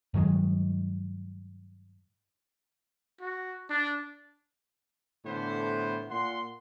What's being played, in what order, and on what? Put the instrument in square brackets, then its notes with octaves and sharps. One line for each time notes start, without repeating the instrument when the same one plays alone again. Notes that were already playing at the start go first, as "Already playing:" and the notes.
[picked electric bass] G2 D#3 F#3 G#3
[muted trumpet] F#4
D4
[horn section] A2 D3 E3 B3 C5
A#2 F#5 C6